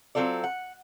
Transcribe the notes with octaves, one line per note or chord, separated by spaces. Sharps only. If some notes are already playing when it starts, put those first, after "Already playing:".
F#3 C4 F4 A4 D5
F#5